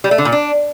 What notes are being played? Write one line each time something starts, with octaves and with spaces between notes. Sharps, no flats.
G3
A3
D3
A#2
D4